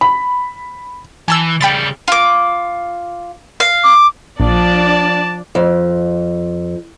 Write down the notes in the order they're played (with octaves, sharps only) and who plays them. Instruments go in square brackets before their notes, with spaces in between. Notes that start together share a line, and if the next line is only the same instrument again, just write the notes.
[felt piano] B5
[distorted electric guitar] E3 [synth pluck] G#5 A5 E6
[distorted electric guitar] C#3 G3 [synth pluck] G5 B5 A6
[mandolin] F4 D6
F5
[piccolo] D6
[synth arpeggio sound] A#1 [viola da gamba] F3 [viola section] D4 D5 [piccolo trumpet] A5
[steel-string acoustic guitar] F2